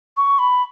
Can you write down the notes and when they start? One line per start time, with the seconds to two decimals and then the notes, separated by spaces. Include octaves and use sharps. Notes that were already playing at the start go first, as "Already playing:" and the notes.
0.17 C#6
0.39 B5